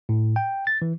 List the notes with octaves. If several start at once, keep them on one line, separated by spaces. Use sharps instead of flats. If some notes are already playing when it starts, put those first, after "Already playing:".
A2
G5
A6
E3